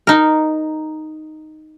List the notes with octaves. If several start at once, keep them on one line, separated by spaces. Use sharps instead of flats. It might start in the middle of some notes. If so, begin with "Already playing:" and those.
D#4 A#4